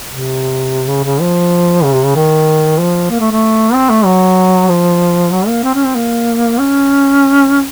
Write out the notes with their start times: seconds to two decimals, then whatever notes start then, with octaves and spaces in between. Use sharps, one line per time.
0.09 C3
0.89 C#3
1.04 C#3
1.21 F3
1.84 C#3
1.94 C3
2.05 C#3
2.15 D#3
2.79 F3
3.10 A#3
3.20 A3
3.32 A3
3.74 C4
3.90 A3
4.05 F#3
4.69 F3
5.32 F#3
5.48 A#3
5.64 C4
5.74 C#4
5.85 C4
5.95 A#3
6.59 C#4